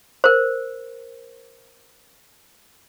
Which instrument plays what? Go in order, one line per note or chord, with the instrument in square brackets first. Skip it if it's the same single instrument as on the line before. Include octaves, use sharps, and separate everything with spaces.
[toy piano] A#4 C5